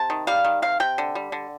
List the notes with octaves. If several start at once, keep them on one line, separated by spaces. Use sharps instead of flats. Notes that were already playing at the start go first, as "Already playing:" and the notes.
Already playing: C3 A5
D#3
G3 F5
D#3
C3 F5
C3 G5
D3
G3
D3